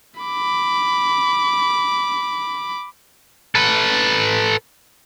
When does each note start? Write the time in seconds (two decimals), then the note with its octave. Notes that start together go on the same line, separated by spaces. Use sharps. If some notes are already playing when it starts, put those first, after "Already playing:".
0.21 B5 D6
3.55 A4 B4